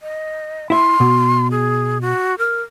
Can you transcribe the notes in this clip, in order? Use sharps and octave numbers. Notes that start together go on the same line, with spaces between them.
D#5
E4 E5 C6
B2
G#4
F#4
A#4